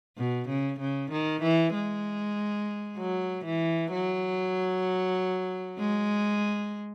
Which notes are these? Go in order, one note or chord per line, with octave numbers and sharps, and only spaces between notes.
B2
C#3
C#3
D#3
E3
G#3
F#3
E3
F#3
G#3